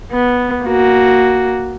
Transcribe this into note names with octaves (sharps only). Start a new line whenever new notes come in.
B3
A#3 F#4